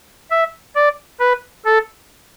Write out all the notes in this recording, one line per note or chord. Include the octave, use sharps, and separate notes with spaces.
E5
D5
B4
A4